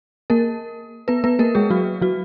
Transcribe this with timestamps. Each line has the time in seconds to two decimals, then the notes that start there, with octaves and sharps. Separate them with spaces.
0.30 A#3 A#4
1.08 B3 B4
1.24 B3 B4
1.39 A#3 A#4
1.55 G#3 G#4
1.70 F#3 F#4
2.01 F#3 F#4